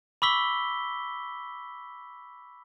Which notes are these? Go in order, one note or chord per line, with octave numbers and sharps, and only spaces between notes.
B5 C#6 D6 E6 B6 G7